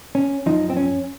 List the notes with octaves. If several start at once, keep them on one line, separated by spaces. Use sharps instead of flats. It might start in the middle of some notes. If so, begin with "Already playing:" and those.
C#4
F#2 F3 D#4
C4
C#4